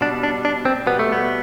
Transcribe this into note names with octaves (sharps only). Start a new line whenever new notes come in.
B2 G3 D4
D4
D4
C4
B2 G3 B3
A3
B3